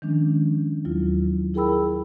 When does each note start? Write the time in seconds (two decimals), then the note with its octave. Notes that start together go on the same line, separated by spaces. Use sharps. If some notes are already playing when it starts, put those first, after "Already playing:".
0.02 D#3 F3 G#3 C#4 D4
0.85 D#2 F#3 E4 F4
1.54 E4 G#4 A#4 G5 B5 E6